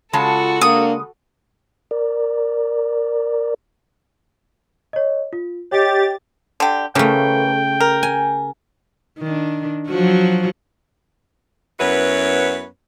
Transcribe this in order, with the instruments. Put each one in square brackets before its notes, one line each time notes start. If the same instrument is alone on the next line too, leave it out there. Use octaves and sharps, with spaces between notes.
[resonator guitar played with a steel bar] C#3 G#3 A5 [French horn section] F4 [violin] F#4 A4
[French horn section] A#3 D4 [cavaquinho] D#6
[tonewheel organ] A#4 D5
[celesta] C#5 D#5
F4
[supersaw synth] G4 A6 [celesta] C#5 D#5 G5
[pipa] D3 G4
[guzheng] C#3 A3 [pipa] E3 A#3 [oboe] G5
[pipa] A#4
[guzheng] G#5
[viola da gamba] D#3 D4
F3 F#3 F#4
[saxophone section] F#2 B3 E4 F#4 B4 C#5